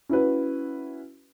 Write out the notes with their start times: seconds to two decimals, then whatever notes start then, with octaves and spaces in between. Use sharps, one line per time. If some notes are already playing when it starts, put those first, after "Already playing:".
0.09 C#4 E4 F#4 B4